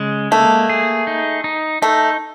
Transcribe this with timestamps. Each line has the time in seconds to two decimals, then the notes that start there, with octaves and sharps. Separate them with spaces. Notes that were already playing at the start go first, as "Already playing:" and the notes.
Already playing: C#3 G#3
0.31 A3 A#3
0.69 G#4
1.07 D#4
1.44 D#4
1.82 A3 D#4